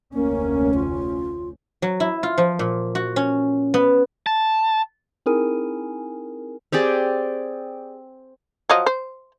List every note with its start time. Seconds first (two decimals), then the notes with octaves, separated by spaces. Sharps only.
0.14 F1 D2 A#3 C#4
0.74 F4
1.82 F#3
2.00 E4
2.23 F4
2.38 F3
2.59 A#2
2.95 F#4
3.16 C#4
3.74 B3
4.26 A5
5.26 C4 D#4 E4 G#4 A#4 G#5
6.72 C4 G4 G#4 D5
8.69 F3 F#3 D#5
8.86 C5